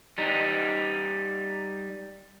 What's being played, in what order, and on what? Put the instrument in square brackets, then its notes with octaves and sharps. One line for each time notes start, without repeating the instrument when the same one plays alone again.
[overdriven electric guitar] G3 D#4